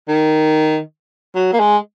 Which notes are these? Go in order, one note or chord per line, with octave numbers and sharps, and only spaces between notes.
D#3
F#3
A#3
G#3